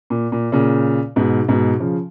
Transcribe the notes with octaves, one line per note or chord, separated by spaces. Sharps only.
A#2
A#2
A#2 C#3
G#2 B2
G#2 B2
C#3 F3